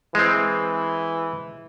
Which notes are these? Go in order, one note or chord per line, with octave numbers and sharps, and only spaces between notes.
E3 G#3 C4